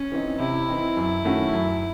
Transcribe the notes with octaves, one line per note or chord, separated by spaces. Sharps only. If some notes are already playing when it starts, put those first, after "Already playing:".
Already playing: C#4
E3 C4 D#4
C3 E4
E3 C4 D#4
F#2
D#3 A3 C#4 F#4
F#2